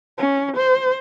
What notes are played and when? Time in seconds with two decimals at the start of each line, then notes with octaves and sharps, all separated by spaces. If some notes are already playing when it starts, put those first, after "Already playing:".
0.18 C#4
0.56 C5